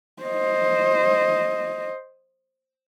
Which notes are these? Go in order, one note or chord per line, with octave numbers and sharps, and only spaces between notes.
C5 D#5